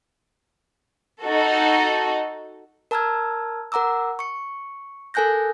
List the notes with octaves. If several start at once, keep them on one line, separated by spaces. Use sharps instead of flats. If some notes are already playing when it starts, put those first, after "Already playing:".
D#4 F#4 A4
A#4 A5 A#5 E6 F6 G#6
A#4 F#5 A#5 D6 E6
C#6 C#7
A4 A#4 G#5 F#6 G6 A#6